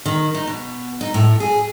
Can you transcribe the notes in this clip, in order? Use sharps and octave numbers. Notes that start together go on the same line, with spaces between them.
D#3
D#4
B2
D#4
A2
G#4